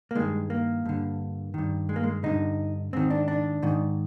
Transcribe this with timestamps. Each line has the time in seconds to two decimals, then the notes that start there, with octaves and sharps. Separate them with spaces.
0.11 A#3
0.15 G2 D#3 G#3
0.50 A#3
0.85 G2 D3
1.54 G2 D#3
1.89 G#3
1.96 A#3
2.04 G#3
2.24 G2 D3 D#4
2.93 G#2 D#3 C4
3.10 D4
3.28 D4
3.63 G#2 D#3